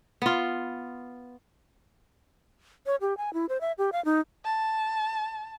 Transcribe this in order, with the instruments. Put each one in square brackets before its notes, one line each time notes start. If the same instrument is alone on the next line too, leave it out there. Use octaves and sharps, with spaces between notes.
[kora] B3 F4
[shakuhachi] C#5
G4
G#5
E4
C5
E5
G4
F5
D#4
[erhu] A5